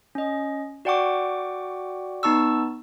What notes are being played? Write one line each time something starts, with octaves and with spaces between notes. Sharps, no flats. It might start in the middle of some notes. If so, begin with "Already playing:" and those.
C#4 D#5
F#4 D5 F#5 G5 C#6 D6
B3 D#4 A5 C#6 E6